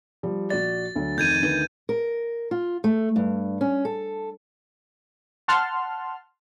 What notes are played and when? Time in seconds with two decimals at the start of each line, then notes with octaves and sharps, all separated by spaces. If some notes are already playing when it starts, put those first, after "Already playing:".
0.23 F3 G3
0.50 A#1 F#4 D5 A6
0.96 D2 F#3
1.18 F1 D#3 G6 G#6 D#7
1.42 D2 D#3 B4
1.89 A#4
2.51 F4
2.84 A3
3.16 G2
3.61 C#4
3.85 A4
5.48 F#5 A5 C6 F6